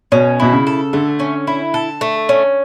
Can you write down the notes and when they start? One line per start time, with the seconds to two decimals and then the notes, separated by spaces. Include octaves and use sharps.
0.12 B2 C#4
0.40 B2 E4
0.53 C#3
0.67 A4
0.93 D3 A3
1.20 C#4
1.47 E4
1.74 A4
2.01 A3
2.29 C#4